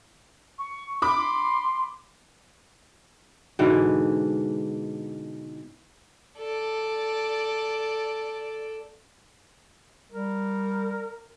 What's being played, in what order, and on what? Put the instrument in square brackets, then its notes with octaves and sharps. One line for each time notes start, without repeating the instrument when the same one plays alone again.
[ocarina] C#6
[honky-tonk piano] B5 D6
[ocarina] C6
[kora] G#2 B2 D3 E3
[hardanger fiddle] A4 D5
[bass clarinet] G3 [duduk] A#4